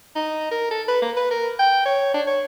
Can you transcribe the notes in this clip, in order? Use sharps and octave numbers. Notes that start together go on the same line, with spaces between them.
D#4
A#4
A4
B4
A#3
B4
A#4
G5
C#5
D4
C#5